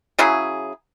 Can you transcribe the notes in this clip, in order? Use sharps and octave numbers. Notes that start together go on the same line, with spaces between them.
C#3 F#3 E4 G#4